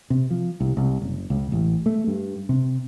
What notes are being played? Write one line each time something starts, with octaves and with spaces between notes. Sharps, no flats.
C3
F3
C2
C2
F#1
C#2
A1
A3
G2
C3